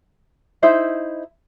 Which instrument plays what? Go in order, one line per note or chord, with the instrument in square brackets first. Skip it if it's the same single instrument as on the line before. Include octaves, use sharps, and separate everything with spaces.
[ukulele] D#4 E4 C5 E5